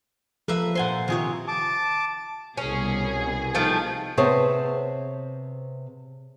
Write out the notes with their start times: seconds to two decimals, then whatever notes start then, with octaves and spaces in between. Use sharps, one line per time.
0.48 F3 A#3 A4 B4 E5
0.75 A#2 C5 F#5 G#5 C6
1.08 C3 D#3 F4 G#4 C#5
1.48 A5 D6
2.57 C2 B2 C#4 G#4
3.55 D#3 F3 A3
4.17 C3 B3 G#4 C5 C#5 A5